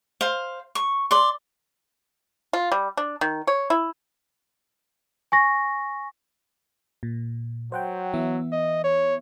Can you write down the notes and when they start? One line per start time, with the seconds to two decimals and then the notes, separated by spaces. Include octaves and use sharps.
0.21 C5 F5
0.75 C#6
1.11 D5 C6
2.53 F4
2.72 G3
2.97 D4
3.21 D#3
3.47 C#5
3.70 E4
5.32 G#5 C#6 A#6
7.03 A#2
7.72 F#3 C5 F#5 G5
8.13 E3 B3 E5
8.52 D#5
8.84 C#5